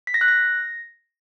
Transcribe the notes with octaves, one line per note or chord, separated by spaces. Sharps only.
B6
A#6
F#6
A#6